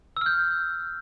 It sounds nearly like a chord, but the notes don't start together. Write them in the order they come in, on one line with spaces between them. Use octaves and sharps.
E6 F6 G6